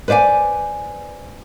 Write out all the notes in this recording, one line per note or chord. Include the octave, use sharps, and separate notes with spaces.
B4 C5 D5 F5 G#5